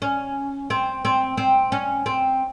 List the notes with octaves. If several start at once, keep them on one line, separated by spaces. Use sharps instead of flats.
C#4
C4
C4
C4
C#4
C4